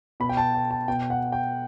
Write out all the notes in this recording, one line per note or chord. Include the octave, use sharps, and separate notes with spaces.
B2 B5
G5
A5
G5
A5
B2 G5
F#5
G5